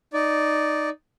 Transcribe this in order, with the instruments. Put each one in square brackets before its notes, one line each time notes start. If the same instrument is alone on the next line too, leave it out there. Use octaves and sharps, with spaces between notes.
[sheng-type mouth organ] D#4 D5